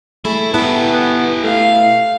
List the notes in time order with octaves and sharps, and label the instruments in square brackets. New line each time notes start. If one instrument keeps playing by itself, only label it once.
[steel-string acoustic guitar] A3 G#4 [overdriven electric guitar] E4
[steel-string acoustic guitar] B2 E4 [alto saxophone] B3 [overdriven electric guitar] G4 A4
[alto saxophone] B3
[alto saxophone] A3 [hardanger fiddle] F5